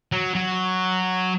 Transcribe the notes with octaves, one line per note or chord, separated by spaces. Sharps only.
F#3
F#3